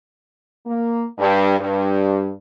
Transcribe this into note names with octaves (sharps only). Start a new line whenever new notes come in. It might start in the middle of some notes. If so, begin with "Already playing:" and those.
A#3
G2
G2